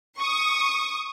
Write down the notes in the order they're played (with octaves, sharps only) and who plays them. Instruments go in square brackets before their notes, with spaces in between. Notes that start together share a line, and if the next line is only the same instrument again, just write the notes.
[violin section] C#6 D#6